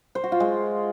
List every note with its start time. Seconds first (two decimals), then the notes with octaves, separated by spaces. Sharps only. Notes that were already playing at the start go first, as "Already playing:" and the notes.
0.15 C5
0.24 F#4
0.32 F4
0.40 G#3